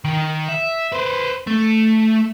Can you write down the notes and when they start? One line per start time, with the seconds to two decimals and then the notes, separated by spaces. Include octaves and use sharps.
0.05 D#3
0.49 E5
0.92 B4 C5
1.47 A3